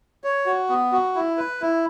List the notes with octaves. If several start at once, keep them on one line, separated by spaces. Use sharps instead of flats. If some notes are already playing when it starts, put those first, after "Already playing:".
C#5
F#4
B3
F#4
E4
B4
E4